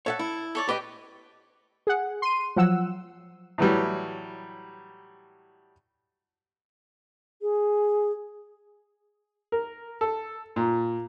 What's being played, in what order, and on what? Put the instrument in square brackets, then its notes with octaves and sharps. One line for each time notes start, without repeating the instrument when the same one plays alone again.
[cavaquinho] A4 [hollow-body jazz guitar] C#5 E5 F#5
[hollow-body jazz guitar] E4
[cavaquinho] A4 C#5 D5
[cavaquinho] G4 [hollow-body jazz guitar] B4 D#5
[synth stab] G#4 F#5
C6 D#7
F3 F#3 F#5 E6
[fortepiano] A2 E3 F#3 G3
[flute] G#4
[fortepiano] A#4
A4
A#2